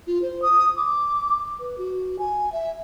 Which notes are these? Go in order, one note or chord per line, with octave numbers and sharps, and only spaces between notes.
F4
C5
D#6
D6
B4
F#4
G#5
E5